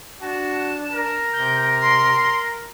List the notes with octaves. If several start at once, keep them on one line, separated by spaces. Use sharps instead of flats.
D4 F#4 A5
A#4
C3 G6
C6